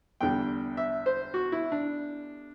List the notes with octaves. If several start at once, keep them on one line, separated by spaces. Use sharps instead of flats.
E2 D3 G3 G5
E5
C5
F#4
E4
D4